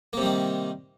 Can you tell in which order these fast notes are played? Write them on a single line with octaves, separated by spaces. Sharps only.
A#3 C3 G3 D#3